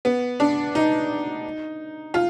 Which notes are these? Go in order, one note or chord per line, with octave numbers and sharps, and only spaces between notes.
B3
D4
D#4
F4